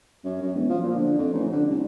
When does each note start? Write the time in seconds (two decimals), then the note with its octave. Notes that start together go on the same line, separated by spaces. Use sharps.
0.25 F#2
0.42 F#2
0.55 E1
0.69 F3
0.83 A#2
0.96 D3
1.18 F2
1.34 A1
1.52 D3
1.69 C2